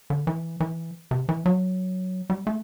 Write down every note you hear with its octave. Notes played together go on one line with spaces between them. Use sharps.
D3
E3
E3
C3
E3
F#3
G3
A3